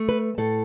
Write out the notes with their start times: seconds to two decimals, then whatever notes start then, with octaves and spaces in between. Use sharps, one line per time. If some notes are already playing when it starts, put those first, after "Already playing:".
Already playing: A3
0.09 B4
0.38 A2 A4